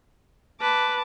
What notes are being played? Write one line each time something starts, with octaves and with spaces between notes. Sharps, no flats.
B4 A5 D6